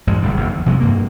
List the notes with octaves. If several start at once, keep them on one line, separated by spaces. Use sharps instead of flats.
A1 G#2 G#3
F1 D3 G3
F#1 D#2
E2
C3 F3 F#3 G#3
G2 A#3